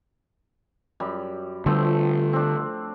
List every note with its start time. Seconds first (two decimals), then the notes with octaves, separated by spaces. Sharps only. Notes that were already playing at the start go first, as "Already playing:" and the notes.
1.00 F#2 G3 B5
1.66 D3 F3 G3 A3 C4
2.33 C4 D4